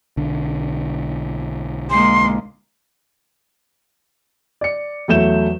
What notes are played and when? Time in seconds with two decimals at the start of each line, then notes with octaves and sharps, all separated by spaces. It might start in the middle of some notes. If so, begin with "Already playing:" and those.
0.17 B1 D3
1.90 G#3 A#3 C6
4.61 D5 C#7
5.08 E2 F#3 A3 G6 E7